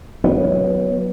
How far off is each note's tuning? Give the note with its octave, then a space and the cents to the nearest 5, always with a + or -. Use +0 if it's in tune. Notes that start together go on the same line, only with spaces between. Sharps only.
F#3 +0 B3 -15